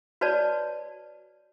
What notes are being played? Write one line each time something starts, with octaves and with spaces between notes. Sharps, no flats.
F#4 B4 C#5 D5 A5